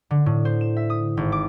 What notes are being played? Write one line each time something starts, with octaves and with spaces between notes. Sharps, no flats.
D3
A2
C5
E7
E5
D#6
G#1
D6